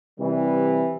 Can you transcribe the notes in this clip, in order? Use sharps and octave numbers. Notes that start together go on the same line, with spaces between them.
C3 E3 G3